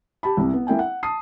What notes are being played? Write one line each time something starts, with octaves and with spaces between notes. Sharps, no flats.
G4 A5 B5
C2 C3
B3
A#3 E4 G5 G#5
F#5
A5 D#6 C7